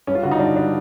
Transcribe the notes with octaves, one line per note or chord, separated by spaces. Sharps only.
G2 C#4
F4
D3 F#4
D#4
G2 D4
G3 D4